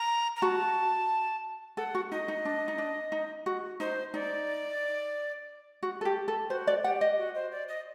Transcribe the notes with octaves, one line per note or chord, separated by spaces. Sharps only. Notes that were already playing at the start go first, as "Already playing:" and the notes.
Already playing: A#5
A#5
F#4 A5
A4 F#5
F#4
D#4 D#5
D#4
D4
D#4
D4
D#4
F#4
D#4 C5
D#4 D5
F#4
A4
G4
A4
F#4 C5
D5
G4 F#5
D#5
F#4
C5
D5
D#5